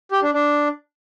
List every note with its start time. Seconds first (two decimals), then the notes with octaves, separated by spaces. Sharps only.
0.11 G4
0.22 D4
0.33 D4